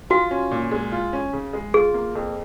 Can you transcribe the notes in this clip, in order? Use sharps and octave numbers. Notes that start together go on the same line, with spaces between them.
F4 F#4
C#4
A#2
G#3
F4
C#4
C#3
G#3
F4 G#4
A#3
F2